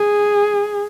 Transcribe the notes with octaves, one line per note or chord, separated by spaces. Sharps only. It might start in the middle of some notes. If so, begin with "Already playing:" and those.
Already playing: G#4